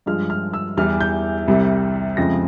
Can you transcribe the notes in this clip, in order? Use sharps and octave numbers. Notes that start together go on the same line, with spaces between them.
G2 F3 G#3 F6
F6
E6
E2 E3 G3 F6
G6
C2 C3 G3
F2 C#3 F3 G#3 A#6